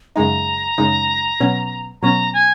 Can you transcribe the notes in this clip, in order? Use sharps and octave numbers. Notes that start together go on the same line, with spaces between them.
F#2 C#3 G#3 D#4 A#5
F#2 C#3 G#3 D#4
B2 F#3 C#4
B2 F#3 C#4 A#5
G#5